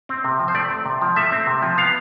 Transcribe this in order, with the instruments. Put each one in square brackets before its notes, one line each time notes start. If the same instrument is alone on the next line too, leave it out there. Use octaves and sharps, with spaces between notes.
[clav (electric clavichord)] C4
C3
F3
C5
A3 D5
C4
C3
F3
A3 E5
C4
C3
F3
B3 F5